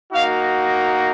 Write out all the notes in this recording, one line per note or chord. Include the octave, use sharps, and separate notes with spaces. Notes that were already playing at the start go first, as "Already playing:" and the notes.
A#3 D#4 F#4 F5